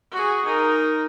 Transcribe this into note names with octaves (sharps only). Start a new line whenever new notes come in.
F#4 G#4
D#4 A#4